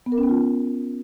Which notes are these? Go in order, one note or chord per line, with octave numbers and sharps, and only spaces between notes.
B3
A#4
C#4
B3
F4